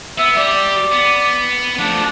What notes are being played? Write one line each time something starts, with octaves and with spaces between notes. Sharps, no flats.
B3 E5
G3 D5
B3
F3 A3 D4